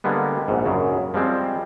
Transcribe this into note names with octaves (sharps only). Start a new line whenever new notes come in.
D3 G3 G#3 A#3 B3
A#1 G#2
F#2 C#3
F3 G3 G#3 C4